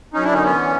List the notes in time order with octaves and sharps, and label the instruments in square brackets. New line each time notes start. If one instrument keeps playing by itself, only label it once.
[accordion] F#2 C#4 D#4
D4 E4
D3 C#4 D#4
B3 C#4
E3